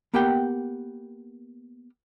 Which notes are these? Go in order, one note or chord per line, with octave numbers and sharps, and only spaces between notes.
A#3 B3 G4 A#4 F#5 G5